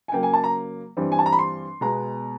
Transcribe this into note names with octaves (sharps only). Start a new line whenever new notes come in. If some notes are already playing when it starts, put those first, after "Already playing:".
G#5
C#3 F#3 A#3 G5
G#5
A5
A#5
G2 E3 G3 C4
G#5
A5
A#5
B5
C6
B2 G#3 B3 A#5